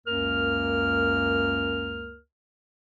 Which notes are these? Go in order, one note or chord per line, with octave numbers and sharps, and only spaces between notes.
C#2 F#2 A#3 A#4 F6